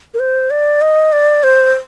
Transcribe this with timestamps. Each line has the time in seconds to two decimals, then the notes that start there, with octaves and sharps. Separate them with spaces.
0.14 A#4
0.19 C5
0.50 D5
0.81 D#5
1.12 D5
1.43 C5